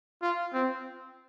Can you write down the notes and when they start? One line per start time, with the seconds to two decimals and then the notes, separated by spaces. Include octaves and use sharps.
0.22 F4
0.53 C4